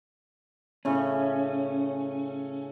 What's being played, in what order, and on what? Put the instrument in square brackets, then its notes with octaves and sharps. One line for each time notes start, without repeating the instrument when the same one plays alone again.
[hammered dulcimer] A2 C#3 [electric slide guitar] C#4